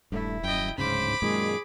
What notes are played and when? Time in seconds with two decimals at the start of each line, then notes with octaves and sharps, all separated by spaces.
0.12 D#1 G2 A3 E4
0.44 F#2 D#5 G5
0.78 D1 G#2 C#3 C5 B5 D6
1.22 F#2 A#2 D#3 G#3 G#4